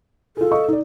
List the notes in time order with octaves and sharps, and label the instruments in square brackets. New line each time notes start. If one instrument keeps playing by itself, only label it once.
[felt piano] F4 G#4 [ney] A4
[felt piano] D#5 F5 C#6
D#4 D5